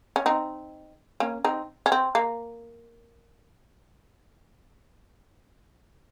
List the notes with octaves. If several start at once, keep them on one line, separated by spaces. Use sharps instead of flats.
C#4
C4 D#4
A#3 C#4
C4 D#4
C#4
C4
A#3